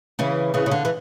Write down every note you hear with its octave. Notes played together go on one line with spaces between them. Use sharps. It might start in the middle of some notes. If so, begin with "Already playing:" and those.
C#3 E3
C#3 E3
C#3
D3
E3